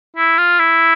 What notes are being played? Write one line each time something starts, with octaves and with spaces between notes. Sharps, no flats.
E4
F4
E4